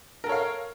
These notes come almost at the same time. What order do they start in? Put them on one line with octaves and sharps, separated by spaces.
A#4 A4 C#5 F5